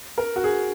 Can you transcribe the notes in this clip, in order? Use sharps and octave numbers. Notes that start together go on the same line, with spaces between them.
A#4
F#4
G#4